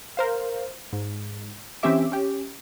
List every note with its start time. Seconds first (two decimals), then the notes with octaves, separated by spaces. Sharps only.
0.17 A#4 C5 F5
0.93 G#2
1.83 E3 C4 C#4 G4 E5 D6
2.12 C#4 G4